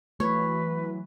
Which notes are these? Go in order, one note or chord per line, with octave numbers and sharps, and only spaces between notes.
E3 F#3 A3 B4 C#5